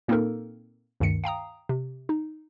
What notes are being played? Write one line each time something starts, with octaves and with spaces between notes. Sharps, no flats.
A#2 A#3 C4 D#4 A4 A#4
D2 G2 D#3 C#7
F5 G5 A#5 D#6
C3
D#4